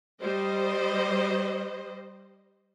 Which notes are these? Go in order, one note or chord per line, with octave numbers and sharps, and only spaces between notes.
G3 C5 D#5